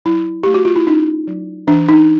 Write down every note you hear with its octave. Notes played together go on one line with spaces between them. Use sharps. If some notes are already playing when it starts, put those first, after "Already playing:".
F#3 E4
A3 G4
F#4
F4
E4
C#4 D#4
F#3
E3 D4
D#4